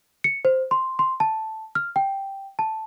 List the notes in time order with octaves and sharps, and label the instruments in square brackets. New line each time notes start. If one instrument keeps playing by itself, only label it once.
[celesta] C#7
C5
C6
C6
A5
F6
G5
A5